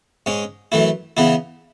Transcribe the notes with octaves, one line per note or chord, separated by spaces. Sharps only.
G#2 G#3 C#4
F#2 E3 A3 E4
C#3 E3 B3 E4